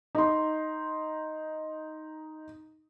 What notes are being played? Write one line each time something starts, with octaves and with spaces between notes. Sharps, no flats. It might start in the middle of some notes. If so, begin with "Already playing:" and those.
D#4 C6